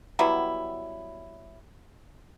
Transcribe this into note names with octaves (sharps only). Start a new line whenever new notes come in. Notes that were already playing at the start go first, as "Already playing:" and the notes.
F#3 G3 B3 E4